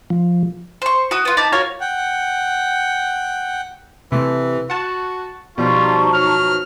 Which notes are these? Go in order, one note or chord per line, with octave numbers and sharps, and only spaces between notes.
F3
C5 C#6
F#4 D#6
B3 F4
D#4 A5 B5 D6
F4 F#4 A#4 C#5
F#5 G5
C3 E3 A3
F#4 F#5 A5
B2 F3 G3 D#4 F4 A5 C#6
F#3 F6